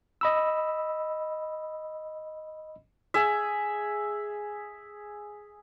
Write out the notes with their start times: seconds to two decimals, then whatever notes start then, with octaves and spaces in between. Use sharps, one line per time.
0.21 D#5 B5 E6
3.14 G#4 E5